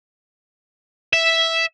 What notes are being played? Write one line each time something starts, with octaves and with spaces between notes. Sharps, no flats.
E5